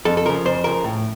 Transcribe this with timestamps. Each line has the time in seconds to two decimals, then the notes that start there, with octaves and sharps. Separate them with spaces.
0.05 F2 A4
0.17 A4
0.25 C#3 F3 A#4
0.45 F2 C5
0.64 C#3 F3 A#4
0.84 A2